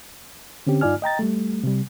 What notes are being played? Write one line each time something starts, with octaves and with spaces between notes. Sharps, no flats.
D3 C4 C#4 G4
G2 D#4 F4 D5 G#5 F6
D#5 G5 A#5 A6
G3 A3
C3 G3